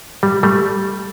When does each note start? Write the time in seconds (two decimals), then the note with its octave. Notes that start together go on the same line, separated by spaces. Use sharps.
0.23 G3
0.43 G3 A3